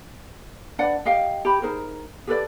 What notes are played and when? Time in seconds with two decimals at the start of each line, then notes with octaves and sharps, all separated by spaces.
0.79 D4 B4 D5 F#5
1.05 G4 D#5 F5 G5
1.45 G4 B5
1.62 D#4 G#4 A#4 C5
2.27 G4 A4 B4 D5